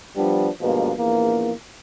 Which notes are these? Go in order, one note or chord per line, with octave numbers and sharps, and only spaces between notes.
F3 G3 B3 D4
G2 B2 F3 G#3 A#3
A#1 E2 A#3